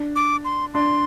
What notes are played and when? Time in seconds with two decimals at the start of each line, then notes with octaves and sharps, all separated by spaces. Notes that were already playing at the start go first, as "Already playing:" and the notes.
Already playing: D4
0.16 D6
0.45 C6
0.74 D4 C6